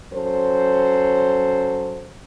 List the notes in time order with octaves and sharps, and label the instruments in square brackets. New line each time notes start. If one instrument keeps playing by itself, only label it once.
[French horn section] F#3 C#4 A4 C5